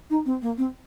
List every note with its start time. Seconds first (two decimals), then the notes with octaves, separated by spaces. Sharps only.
0.10 D#4
0.26 C4
0.42 A#3
0.58 C4